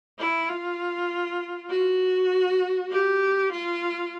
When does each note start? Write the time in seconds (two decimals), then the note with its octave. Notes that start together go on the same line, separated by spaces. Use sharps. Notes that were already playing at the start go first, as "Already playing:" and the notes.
0.19 E4
0.49 F4
1.70 F#4
2.91 G4
3.52 F4